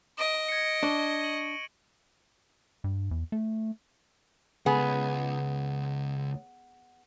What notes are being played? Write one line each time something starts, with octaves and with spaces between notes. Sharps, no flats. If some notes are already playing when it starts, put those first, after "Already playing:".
D#5 D7 E7
G#6 A#6 C#7
D4 C#6 G7
D#7 F#7
G2
E2
A3
C#2 B3 G#4